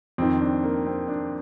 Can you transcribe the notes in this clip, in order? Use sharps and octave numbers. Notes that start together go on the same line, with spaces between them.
F2 D#3 C4
D4
A#3
C4
D4